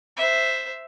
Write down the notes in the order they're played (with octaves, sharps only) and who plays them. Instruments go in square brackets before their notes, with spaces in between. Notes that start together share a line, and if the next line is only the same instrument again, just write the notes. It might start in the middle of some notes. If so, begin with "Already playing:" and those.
[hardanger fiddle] C5 E5